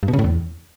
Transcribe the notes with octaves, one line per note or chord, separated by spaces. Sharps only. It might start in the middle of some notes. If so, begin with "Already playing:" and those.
G2
B2
C#3
A2
E2